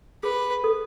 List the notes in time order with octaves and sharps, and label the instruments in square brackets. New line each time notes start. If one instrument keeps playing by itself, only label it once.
[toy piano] G#4 [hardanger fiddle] B4
[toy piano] A4